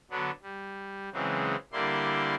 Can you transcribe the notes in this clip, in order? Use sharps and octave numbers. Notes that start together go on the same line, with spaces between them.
D3 F#3 B3 D4
G3
C#3 E3 F#3 G#3 C4
D3 G3 A#3 E4 D5 C6